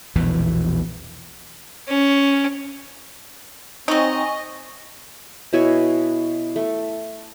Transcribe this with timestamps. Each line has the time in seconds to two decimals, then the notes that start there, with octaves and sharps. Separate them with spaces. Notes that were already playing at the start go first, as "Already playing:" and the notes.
0.16 A#1 E2 B2 E3
1.88 C#4
3.88 F#3 C4 D#4 D#5 G#5 C#6
5.53 B2 E4 C#5 G#5
6.56 A3